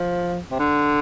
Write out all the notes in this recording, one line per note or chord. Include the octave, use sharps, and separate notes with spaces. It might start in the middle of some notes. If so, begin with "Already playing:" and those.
Already playing: F3
C3
D3